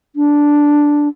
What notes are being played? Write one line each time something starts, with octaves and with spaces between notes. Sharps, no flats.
D4